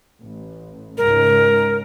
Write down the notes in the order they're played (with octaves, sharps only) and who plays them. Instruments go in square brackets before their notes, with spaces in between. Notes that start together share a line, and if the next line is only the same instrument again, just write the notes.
[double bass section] A1
[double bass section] C#2 G#2 [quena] A#4